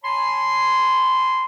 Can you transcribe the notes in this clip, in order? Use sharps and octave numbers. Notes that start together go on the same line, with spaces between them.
C#5 G#5 A5 B5 C6